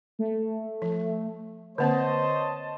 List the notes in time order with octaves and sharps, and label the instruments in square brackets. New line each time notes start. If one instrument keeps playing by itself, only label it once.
[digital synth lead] A3
[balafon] F3
[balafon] D3 A#3 C4 [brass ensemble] C5 C#5 D#5 [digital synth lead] A5